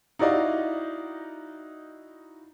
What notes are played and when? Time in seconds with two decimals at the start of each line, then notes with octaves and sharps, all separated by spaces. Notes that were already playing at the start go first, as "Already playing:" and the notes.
0.19 D#4 E4 F#4 D5 D#5 F5